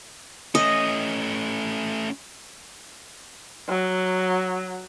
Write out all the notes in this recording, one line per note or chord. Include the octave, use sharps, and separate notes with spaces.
A3 C#4 D#5
F#3